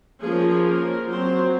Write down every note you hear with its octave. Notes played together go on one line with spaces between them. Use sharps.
F3 A#3 C#4 G#4
A#4
F#3 C4 C5